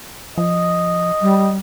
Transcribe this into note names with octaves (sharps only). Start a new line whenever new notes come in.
F3 D#5
G3